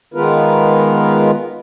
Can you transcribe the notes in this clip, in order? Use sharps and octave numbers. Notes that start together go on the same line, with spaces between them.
D#3 G#3 B3 F4 A#4 B4